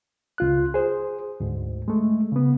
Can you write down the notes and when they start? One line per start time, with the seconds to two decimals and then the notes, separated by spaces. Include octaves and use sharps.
0.38 C#2 F4 F#6
0.74 G#4 C5
1.40 D2 G#2
1.88 G#3 A3
2.32 C#3 B3